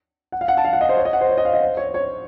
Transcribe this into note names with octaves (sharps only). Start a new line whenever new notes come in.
F#5
F5
F#5
A5
F5
F#5
D#5
C5
C#5
D#5
F#5
C5
C#5
D#5
F5
D#5
C5
C#5
C#5